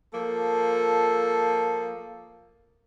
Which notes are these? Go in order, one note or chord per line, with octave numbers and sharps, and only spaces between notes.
F3 A#3 A4